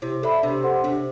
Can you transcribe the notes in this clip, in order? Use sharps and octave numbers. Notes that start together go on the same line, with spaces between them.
C3 E4
D3 A4 E5 B5
C3 D4
A4 C5 F#5 C6
C3 D4